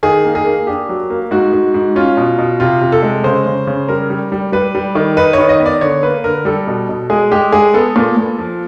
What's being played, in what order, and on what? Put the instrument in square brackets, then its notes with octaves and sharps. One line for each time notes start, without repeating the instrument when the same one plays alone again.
[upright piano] D#3 G#4
A#3
G#4
A#3
D4 G4
F#3
A#3
G#2 F#4
G#2
G#2
C#4 F4
B2
B2
C3 F4
C3
A4
G#3
C#3 C5
C#3
C#3
G3 A#4
G3
G3
G3 B4
G3
D#3
D#4 B4
D#3 C#5
D#5
B3
D5
D3 C#5
A#3 B4
D3 A#4
G3 A4
B2
B2
G#3 G#4
G#3 G4
G#3 G#4
B3 A4
A#2
A#2
F3